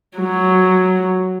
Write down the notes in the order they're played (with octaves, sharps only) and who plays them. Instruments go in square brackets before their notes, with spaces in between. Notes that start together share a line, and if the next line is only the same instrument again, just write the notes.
[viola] F#3